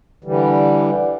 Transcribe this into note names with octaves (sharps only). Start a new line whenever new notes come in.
D3 E3 G3